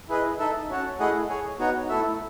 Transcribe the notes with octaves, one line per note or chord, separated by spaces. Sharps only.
E4 G#4 B4 D#5
D#4 A4 E5
C#4 F#4 C#5 F#5 A5
A3 E4 G#4 D#5 F#5
G#4 C#5 G#5
B3 D#4 F#4 C#5
A3 E4 A4 E5